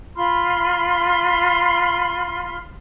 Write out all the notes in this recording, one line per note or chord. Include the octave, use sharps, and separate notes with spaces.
F4 B5 C6 F6